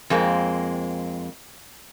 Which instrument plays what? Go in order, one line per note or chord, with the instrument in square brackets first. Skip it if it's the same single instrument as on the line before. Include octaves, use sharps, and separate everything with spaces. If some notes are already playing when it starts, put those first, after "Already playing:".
[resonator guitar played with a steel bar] F2 G#3 A#3 C4